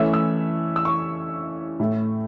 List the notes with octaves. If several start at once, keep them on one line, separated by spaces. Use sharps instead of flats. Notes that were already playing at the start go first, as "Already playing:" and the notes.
Already playing: E3 A3 C#4 E4 E6
E6
E6
C#6
A2 A3 E4